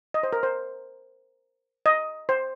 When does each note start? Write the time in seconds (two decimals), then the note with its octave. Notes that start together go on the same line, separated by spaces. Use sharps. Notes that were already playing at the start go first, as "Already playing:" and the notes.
0.14 D#5
0.23 C5
0.33 A#4
0.43 C5
1.86 D#5
2.29 C5